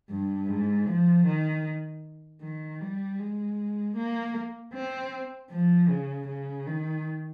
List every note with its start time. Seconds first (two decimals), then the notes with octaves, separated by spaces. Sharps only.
0.10 G2
0.49 G#2
0.88 F3
1.26 D#3
2.41 D#3
2.81 G3
3.19 G#3
3.96 A#3
4.73 C4
5.50 F3
5.89 C#3
6.28 C#3
6.67 D#3